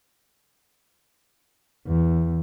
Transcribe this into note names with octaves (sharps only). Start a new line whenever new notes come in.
E2